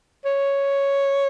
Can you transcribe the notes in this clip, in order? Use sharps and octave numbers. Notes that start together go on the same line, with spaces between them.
C#5